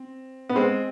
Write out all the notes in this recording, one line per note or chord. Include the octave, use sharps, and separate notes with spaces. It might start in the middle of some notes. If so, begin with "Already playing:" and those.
Already playing: C4
B3
G#3 C4